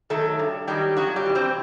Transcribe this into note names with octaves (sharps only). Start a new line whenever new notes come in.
D#3 F#3 A3 A4
G2
D#3 F#3 G3 G4
F2 F#3 F#4
G3 G4
C3 E3
C4 C5